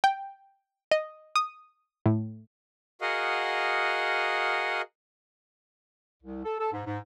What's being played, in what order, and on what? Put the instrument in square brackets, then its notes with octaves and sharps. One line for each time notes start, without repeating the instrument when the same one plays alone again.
[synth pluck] G5
D#5
D#6
A2
[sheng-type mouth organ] F#4 G#4 A#4 D#5 F5 F#5
[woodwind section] C2
A4
A4
G#2
G#2